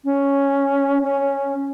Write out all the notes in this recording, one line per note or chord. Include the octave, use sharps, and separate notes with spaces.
C#4
C#4